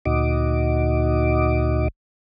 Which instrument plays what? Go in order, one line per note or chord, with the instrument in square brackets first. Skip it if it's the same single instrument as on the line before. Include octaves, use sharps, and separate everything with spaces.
[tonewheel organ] D2 A#2 D#4 F#4 D#5 D6